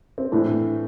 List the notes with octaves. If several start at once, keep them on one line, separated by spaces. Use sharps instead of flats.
C4
A2 E3 D4